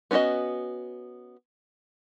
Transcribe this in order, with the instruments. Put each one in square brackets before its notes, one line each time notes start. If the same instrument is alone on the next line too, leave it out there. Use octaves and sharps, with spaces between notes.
[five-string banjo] B3 C#4 F4 F#4 D#5